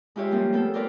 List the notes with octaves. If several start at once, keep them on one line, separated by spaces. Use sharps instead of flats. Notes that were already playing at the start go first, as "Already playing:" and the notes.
G#3 E4 F4 G4 C#5 E5
F3 G3 A#3 C#4
A3 B3 A4
F4 G4 A#4 B4 D5